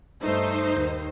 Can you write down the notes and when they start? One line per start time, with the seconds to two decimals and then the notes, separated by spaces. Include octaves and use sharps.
0.21 G2 A3 D#4 C5
0.73 D#2 D#3